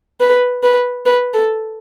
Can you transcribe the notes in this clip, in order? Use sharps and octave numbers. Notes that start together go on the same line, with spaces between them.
B4
B4
B4
A4